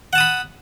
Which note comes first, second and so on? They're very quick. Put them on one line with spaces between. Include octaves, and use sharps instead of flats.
F#5 A5 D#6 B5